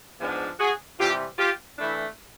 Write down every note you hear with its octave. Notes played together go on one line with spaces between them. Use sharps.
G#2 F3 G#3 B3 D4
F#4 G#4
C3 E3 G3 C4 F4 G4
F4 G4
E3 A3 D4 E4